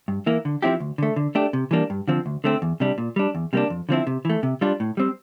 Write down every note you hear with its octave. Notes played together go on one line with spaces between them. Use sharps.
G2
E3 A#3 E4
D3
F3 C4 E4 G4
D2
D3 A3
D3
A3 D4 G4
C3
E3 G3 A#3 D4
G2
D3 F3 C4
D2
D3 A3 C4
E2
C3 G3 D4
A#2
G3 D4
E2
C3 G3 A#3 D4
F2
D3 F3 C4 E4
C3
E3 A3
C3
G3 D4 F4
A2
G3 C4